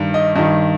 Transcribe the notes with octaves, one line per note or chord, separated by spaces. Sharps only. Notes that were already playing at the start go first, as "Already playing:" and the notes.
Already playing: G2 D#3
D#5
G2 D#3 D#5